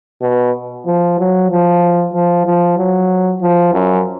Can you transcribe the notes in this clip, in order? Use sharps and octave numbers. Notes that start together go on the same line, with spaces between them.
B2
F3
F#3
F3
F3
F3
F#3
F3
F#2